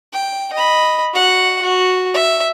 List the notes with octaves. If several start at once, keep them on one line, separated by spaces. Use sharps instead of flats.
G5
D#5 B5
F#4 F#5
F#4
E5